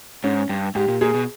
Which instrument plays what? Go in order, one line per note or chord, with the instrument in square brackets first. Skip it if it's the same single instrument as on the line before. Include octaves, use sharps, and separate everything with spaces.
[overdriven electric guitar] G#2 [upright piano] C#4
[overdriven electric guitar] G2
[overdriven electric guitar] G#2 [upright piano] G4
[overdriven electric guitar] A#2
[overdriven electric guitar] A#2 [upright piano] G#4
[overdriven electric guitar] B2